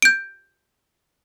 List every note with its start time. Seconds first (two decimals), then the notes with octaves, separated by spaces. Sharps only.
0.02 G6 D7